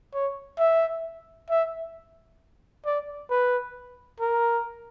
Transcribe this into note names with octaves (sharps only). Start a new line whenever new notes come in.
C#5
E5
E5
D5
B4
A#4